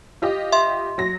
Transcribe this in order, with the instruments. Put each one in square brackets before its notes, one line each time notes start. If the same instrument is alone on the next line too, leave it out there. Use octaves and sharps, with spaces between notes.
[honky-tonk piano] F4 G4 D#5
[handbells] E5 C6
[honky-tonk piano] F#3 A#6